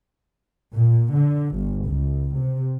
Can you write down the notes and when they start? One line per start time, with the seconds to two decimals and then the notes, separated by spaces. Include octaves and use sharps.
0.76 A#2
1.16 D3
1.56 G1
1.87 C#2
2.39 C3